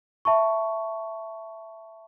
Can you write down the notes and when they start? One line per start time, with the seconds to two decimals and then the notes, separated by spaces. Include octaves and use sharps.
0.25 E5 A5 B5 C#6